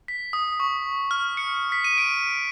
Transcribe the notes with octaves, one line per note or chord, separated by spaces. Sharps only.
B6
D#6
C#6
F6
C#7
B6
D#7
D7